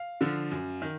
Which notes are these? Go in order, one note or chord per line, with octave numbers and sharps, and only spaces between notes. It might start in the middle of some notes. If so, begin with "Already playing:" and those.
Already playing: F5
D3 F3
F#2
D#3